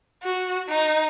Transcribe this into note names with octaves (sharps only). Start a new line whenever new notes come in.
F#4
D#4